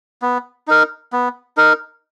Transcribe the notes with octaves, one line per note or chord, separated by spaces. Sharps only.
B3
D#4 A#4
B3
D#4 A#4